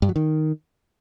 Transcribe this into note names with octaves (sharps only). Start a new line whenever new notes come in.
G2
F#3
D#3